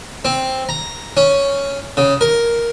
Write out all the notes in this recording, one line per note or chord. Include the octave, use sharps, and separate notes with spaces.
C4
A#5
C#4
C#3
A#4